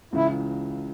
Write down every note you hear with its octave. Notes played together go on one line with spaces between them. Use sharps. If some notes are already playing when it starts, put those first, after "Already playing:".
C#2 C#3 E3 E4